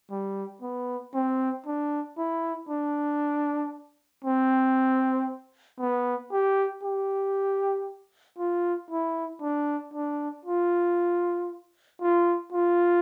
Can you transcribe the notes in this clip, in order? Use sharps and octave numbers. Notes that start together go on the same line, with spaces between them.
G3
B3
C4
D4
E4
D4
C4
B3
G4
G4
F4
E4
D4
D4
F4
F4
F4